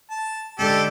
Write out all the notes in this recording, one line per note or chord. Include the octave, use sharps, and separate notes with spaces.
A5
D3 G#3 C#4 G4 A4